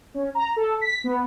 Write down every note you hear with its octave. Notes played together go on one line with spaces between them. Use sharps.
C#4
A#5
A4
B6
B3